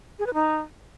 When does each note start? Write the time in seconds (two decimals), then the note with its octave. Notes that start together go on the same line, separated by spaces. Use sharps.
0.19 G#4
0.26 B4
0.34 D#4